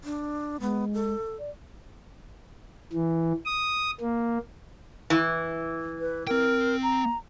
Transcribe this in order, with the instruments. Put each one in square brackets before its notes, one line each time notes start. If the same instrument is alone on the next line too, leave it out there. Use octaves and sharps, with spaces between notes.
[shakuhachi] D4
[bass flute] G#3 [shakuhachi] B3
[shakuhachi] A4
[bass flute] D5
[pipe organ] E3
D#6
A#3
[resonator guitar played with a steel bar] E3
[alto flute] B4
[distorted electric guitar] C4 G5 [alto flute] A#4
[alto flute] A#5